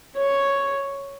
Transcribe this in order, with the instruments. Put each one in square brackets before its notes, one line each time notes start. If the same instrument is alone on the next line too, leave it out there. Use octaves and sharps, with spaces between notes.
[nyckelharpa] C#5